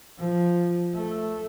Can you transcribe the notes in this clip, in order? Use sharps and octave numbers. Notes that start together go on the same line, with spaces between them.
F3
A3